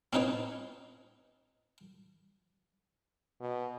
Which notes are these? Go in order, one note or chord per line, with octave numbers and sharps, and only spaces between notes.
C4 C#4 D#4 B4 C#5
B2